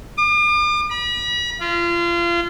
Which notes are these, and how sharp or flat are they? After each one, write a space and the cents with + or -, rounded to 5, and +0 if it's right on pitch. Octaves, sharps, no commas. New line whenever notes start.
D6 +45
B5 -40
F4 -30